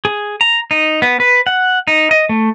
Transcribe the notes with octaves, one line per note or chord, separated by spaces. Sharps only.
G#4
A#5
D#4
B3
B4
F#5
D#4
D#5
A3